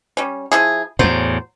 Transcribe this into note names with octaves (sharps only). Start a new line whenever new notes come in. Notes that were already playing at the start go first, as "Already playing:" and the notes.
G3 C#4
F3 E4 G#4
E2 A2 F#3 C5